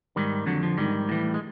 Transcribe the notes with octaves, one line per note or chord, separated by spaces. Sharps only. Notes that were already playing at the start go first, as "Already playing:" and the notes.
G#2 D#3 G3
F2 D3 F#3
F3
G#2 D#3 G3
A2 E3
G#3